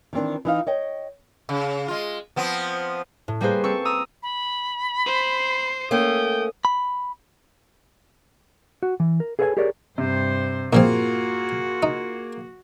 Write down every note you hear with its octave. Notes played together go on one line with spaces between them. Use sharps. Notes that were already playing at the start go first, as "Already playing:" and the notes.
D#3 E3 C4 D4
E3 D#4 F5
C#5 D#5 G5
C#3
G#3 F4
F3 B3 C4
A2
G3 A#3 G#4 B4 C5
C4 A4 C#6
A#5 D#6 E6
B5
C5 C7
A3 A#3 C#4 G5 D#6
B5
F#4
E3
A#4
G#4 A4 B4 C#5 F5 G#5
G4 G#4 A#4 C#5 D5
G2 C3 C5
A#2 F3 A#3 C4 F4 F#4 G#4
D#4